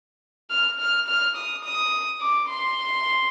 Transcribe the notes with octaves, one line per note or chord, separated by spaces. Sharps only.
F6
F6
F6
D#6
D#6
D6
C6